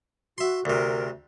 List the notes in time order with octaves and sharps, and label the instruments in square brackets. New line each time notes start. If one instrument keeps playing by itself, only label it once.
[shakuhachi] F#4 [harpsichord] E5 C6
[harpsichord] D2 C3 [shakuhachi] A#4